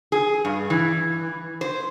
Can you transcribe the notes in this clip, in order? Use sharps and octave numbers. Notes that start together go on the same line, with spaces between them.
G#4
G2
E3
C5